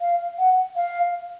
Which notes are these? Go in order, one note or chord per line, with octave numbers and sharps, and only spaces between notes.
F5
F#5
F5